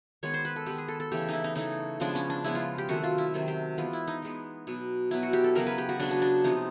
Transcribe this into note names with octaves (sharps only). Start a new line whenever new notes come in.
D#3 G#3 B3 C#5
C5
B4
A4
D#3 G#3 B3 G4
G#4
A4
A4
C#3 E3 A3 G4
D#4 E4
D#4
C#3 E3 A3 D#4
C#3 F3 G#3 B3 D4
C#4
D4
C#3 F3 G#3 B3 E4
F4
G4
C3 D#3 F#3 A3 F#4
F4
E4
C3 D#3 F#3 A3
G4
E3 G#3 B3 F4
E4
D#4
E3 G#3 B3
B2 F#3 B3
B2 F#3 B3 E4
F#4
G4
A4
C#3 F#3 B3 A#4
B4
G4
F#4
C#3 F#3 B3 D4
D4
D4
C3 F3 G#3 B3 D#4